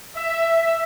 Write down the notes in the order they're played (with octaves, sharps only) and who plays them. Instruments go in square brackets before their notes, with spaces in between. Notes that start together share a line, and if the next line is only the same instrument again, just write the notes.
[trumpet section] E5